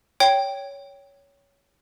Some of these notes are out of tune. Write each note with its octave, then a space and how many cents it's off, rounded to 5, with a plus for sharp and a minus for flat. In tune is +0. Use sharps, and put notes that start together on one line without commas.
C#5 +15 G5 +0